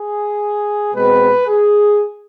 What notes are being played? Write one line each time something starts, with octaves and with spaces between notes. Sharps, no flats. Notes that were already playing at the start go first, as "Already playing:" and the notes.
Already playing: G#4
B2 G#3 C4 B4
G#4